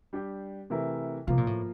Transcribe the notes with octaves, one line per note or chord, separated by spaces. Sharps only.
G3 D4 G4
C3 E3 A3 E4 A#4
C3 F3 A#3 F4
A#2
A2